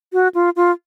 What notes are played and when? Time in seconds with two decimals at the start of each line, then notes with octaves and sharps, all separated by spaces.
0.13 F#4
0.35 F4
0.56 F4